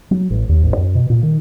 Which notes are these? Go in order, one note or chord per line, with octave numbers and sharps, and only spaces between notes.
F#3
A1
D#2
A1
F#2
B2
A#2
D#3